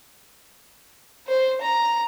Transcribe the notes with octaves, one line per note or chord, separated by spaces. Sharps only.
C5
A#5